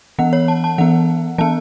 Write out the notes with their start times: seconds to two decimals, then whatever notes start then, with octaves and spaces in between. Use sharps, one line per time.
0.19 E3 B3 F#5
0.33 C#5
0.48 A5
0.64 A5
0.78 E3 B3 F#5
1.38 E3 B3 A5